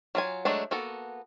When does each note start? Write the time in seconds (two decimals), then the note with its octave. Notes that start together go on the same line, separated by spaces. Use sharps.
0.15 F#3 F4 G#5
0.45 F#3 G#3 A3 D4
0.71 A#3 B3 F#4 A4